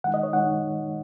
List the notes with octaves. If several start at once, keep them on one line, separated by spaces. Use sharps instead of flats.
D#3 G#3 D#4 F#5
D#5
C#5
D#3 G#3 D#4 F#5